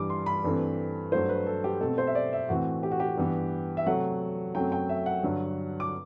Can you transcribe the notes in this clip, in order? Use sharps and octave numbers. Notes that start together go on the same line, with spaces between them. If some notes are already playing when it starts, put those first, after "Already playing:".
Already playing: G2 E3 G3 D6
C6
B5
G2 E3 A3 C4
G2 F#3 A3 C5
B4
A4
G4
B2 A3 C4 A4
C5
E5
D5
E5
A2 E3 A3 C4 F#4
G4
F#4
G4
G2 E3 B3
E5
C3 F#3 A3 C4 F#5
F#2 F#3 A3 C4 G5
G5
E5
F#5
G2 D3 F#3
D6